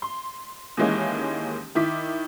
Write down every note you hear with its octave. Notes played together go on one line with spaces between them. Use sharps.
C6
D#2 D#3 E3 G#3 A#3 C#4
D#3 E4 D6 B6